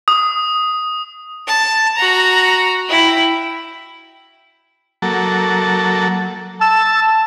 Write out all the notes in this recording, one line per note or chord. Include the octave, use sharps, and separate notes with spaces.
D#6
A5
F#4 A#5
E4 G5
F#3 A#3 A4
A5 E6